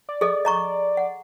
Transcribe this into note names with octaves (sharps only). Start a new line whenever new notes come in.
D5
G#4 A4 D#5
D#5 A#5 C#6
F#5